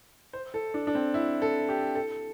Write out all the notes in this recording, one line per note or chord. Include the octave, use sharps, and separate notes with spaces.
C5
A4
D4
D4
C4
E4
A4
G4
A4